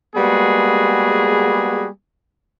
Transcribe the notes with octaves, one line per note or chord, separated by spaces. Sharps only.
G3 G#3 A#3 B3 F#4 G#4